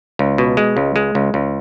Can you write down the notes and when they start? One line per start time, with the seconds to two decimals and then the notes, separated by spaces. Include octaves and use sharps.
0.19 C#2
0.38 B2
0.57 G#3
0.77 C#2
0.96 G#3
1.15 C#2
1.34 C#2